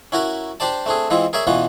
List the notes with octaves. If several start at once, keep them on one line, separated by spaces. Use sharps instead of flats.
C#4 E4 F#4 A#4 A#5
D4 G4 C5 D5 A5
A3 C4 D4 G#4
E3 G#3 C4 E4 F4
G#4 A#4 C#5 D5 E5
B2 E3 B3 C#4 F4